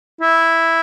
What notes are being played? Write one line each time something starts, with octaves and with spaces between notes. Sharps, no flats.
E4